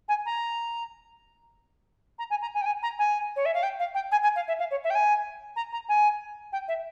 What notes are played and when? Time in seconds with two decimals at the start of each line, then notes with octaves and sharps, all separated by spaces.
0.09 G#5
0.26 A#5
2.19 A#5
2.30 G#5
2.42 A#5
2.54 G#5
2.62 G5
2.66 G#5
2.83 A#5
2.99 G#5
3.36 C#5
3.45 E5
3.54 F5
3.63 G5
3.79 F5
3.95 G5
4.12 G#5
4.23 G#5
4.36 F5
4.48 E5
4.59 F5
4.71 C#5
4.84 E5
4.90 G5
4.95 G#5
5.56 A#5
5.73 A#5
5.89 G#5
6.53 G5
6.68 E5